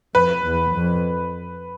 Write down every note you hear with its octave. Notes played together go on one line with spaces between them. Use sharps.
F2 B4
E2
F2